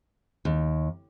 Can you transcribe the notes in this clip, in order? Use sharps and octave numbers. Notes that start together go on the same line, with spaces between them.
D#2